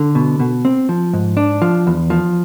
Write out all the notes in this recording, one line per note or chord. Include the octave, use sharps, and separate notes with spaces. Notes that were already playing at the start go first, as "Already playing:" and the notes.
Already playing: D3
B2
B2
C4
F3
G#2
D4
F3
E2
F3